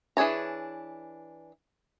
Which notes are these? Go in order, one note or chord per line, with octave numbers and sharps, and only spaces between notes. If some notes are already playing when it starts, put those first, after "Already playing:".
E3 D4 G#4 C#5 A#5